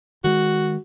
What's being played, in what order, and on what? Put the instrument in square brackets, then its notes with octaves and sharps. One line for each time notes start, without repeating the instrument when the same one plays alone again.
[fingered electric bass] D#3 G#3 [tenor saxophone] F#4